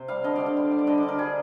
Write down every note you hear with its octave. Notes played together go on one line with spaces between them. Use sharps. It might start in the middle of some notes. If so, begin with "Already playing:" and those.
Already playing: C3 C5
G3 F5
D3 D#5
D3 D5
F5
G3
G3
D5
D3 D#5
D5
D3
A#4
G3 G#4